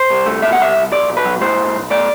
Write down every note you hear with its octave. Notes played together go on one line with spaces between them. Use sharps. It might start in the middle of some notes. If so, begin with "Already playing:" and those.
Already playing: C5
C2
A3
B2 E5
F#5
C2 E5
C2
B1 D5
B1
B4
F#3
A2 C5
B1
B1
A3 D5